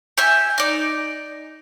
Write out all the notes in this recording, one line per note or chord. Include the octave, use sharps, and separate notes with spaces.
G4 E5 G#5
D#4 D5